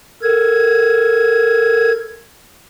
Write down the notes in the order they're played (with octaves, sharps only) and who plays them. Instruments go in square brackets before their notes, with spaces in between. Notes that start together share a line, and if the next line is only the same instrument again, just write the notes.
[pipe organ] A4 A#4 G#6